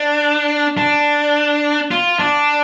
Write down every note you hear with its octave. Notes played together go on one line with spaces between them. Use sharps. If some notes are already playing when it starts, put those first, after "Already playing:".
Already playing: D4
D4
F4
D4